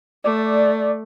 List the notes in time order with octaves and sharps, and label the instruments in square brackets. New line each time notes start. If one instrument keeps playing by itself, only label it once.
[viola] A3 [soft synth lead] D5